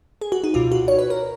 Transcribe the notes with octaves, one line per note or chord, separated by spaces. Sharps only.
G#4
F#4
D#4
C#2 B2 F4
F#4
C#5
B4
A#4